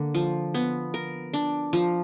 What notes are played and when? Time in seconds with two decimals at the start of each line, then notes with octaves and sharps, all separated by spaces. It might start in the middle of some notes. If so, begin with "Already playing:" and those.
Already playing: D3 A#3
0.14 F3
0.54 B3
0.94 A#4
1.33 D4
1.73 F3